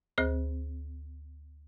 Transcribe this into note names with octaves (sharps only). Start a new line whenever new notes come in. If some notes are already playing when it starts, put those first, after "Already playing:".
D2 C4 G#4 C5